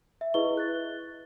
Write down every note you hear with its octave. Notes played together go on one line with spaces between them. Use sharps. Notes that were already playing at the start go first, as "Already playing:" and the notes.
E5
E4 G#4 B4 D#5 C#6 G7
F#6 A6